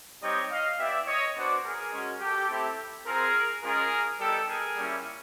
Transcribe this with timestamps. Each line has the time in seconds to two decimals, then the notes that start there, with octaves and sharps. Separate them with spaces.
0.22 G3 C4 D#4 G4 C#5 D#5
0.50 D#5 F5
0.78 B3 E4 G4 D5 E5
1.07 C#5 D#5
1.35 B3 D4 F#4 C5 D5
1.64 G#4 A#4
1.92 G#3 C#4 F#4
2.21 G4 A4
2.49 A3 C4 E4 G4
3.06 C4 F4 G#4 A#4
3.63 G#3 C#4 F4 G#4 A#4
4.20 G3 B3 D#4 G4 A4
4.48 G#4 A#4
4.76 G3 A#3 C#4 E4